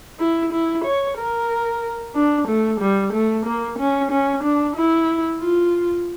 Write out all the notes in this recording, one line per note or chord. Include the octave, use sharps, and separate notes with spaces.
E4
E4
C#5
A#4
D4
A3
G3
A3
A#3
C#4
C#4
D4
E4
F4